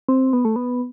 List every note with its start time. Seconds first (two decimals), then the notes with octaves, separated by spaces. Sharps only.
0.09 C4
0.33 B3
0.45 A3
0.56 B3